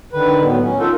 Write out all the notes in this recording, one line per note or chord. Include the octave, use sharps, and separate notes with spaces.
D3 D#3 B4
A2 F#3 B3
C#4
D#4 F4 A4 A#4